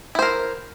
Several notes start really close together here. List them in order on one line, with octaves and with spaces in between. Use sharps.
E4 C5 A#4